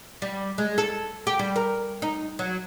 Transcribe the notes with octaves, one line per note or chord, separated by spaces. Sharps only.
G3
G#3
A4
G4
G3
A#4
D#4
F#3